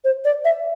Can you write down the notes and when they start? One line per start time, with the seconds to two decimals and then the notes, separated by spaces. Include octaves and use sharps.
0.04 C5
0.24 D5
0.44 E5